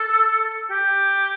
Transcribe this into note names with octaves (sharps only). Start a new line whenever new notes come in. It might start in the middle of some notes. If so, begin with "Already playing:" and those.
Already playing: A4
G4